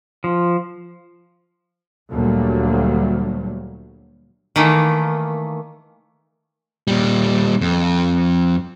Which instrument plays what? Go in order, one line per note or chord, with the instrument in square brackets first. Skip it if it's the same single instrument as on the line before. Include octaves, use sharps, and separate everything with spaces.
[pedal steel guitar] F3
[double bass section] D2 A#2 F#3 G3
[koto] D#3 E3 A3 A#3
[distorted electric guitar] A#2 G3
F2